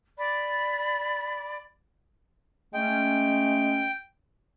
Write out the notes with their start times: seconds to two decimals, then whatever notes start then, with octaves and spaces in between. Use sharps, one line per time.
0.18 D5 B5
2.74 G#3 A3 C#4 G5